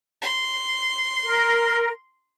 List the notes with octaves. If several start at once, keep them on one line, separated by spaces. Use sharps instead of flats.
C6
A#4